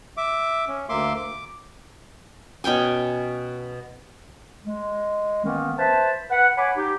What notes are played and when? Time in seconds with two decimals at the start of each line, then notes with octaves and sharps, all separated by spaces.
0.17 E5 D6
0.68 C#4
0.89 D2 A#3 E5 C6 D6
1.17 D6
2.64 B2 C#4 G5 G#5
4.66 G#3
5.44 D#3 E3 A#3 B3 C#4
5.78 B4 C5 E5 A5
6.30 B4 F#5
6.57 C#5 F#5 G#5 B5 D6
6.77 D#4 G4